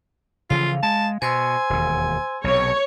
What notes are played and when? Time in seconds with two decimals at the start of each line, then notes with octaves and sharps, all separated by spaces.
0.50 C#3 E3 F3 F4 F5
0.83 G#3 A5
1.22 B2 C5 G#5 C6 E6
1.70 E1 D#2
2.44 B1 C3 C#5